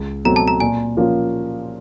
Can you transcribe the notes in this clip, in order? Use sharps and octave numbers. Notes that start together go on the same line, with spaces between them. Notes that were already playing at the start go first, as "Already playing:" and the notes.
Already playing: C#2
B2 F#3 A3 C4 A#5
A5
A#5
A#2 G#5
F3 A#3 C#4 F4